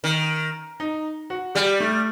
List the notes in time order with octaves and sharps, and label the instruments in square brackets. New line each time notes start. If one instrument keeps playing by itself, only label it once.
[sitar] D#3
[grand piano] D#4
F#4
[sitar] G3 [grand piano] G4
[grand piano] A3